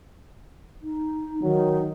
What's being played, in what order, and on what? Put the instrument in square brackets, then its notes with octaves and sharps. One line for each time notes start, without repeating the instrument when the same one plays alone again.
[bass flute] D#4
[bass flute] D#3 [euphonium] F#3